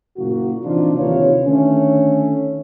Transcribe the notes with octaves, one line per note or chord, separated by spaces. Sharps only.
F#1 A#2 A#3 F#4
C3 E3 F3 D4 D#4 F4
D#2 C3 E3 F4 B4 C#5
D3 D#3 A3 C#4